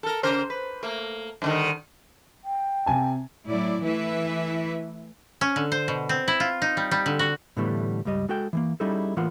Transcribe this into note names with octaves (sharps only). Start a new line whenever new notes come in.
A4 A#4
C#3 A#4 C5
B4
A3 A#3
G2 D3 D#3
G5
C3 G#5 A5
A2 F#3 E4 D5
E3 A3 E4 B4 E5
C#4
D3
C5
B2
C4
E4
F4
D#4
G3
G3
D3
F#4
A2 D3 E3 G3 A3 B3
C#2 G2 G3 D#5
G#3 F#4 A4 G5
E3 G#3 A#3
G3 C#4 D#4 E4 G#4 A4
A2 E3 A#3 F4 F#5